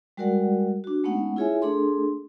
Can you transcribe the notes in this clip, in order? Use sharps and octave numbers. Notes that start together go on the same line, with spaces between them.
G3 G#3 F#4 A#4 D5 F#5
D4 F#4
G#3 A3 B3 C#4 D#4 F#5
E4 F4 G#4 C#5 E5 G#5
A3 D4 G#4 A4 C6